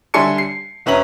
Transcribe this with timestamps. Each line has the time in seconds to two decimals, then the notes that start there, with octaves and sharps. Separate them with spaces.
0.14 D3 G3 E5 G#5 C6 C#7
0.38 C7
0.86 E1 C#4 B4 E5 A#5 F#7